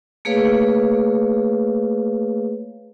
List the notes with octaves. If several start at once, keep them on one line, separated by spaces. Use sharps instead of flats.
A3 A#3 G#4 B4 C#5 F5